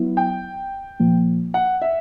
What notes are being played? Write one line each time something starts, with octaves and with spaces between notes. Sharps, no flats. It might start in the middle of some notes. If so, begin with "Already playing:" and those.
Already playing: F#3 B3 E4
G5
A#2 F3 A#3
F#5
E5